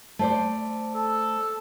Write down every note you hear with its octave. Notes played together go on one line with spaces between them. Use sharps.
A3 C5 D5
A4